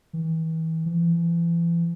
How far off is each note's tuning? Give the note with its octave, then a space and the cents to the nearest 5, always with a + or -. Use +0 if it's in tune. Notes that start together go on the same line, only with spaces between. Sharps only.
E3 -35
E3 +40